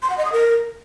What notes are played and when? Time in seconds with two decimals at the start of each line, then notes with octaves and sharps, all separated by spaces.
0.02 C6
0.10 F#5
0.17 D#5
0.25 D#6
0.32 A#4